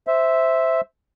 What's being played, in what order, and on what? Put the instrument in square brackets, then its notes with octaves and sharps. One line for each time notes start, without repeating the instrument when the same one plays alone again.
[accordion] C5 E5